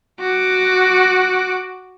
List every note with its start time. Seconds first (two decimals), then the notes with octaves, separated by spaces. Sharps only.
0.20 F#4 D6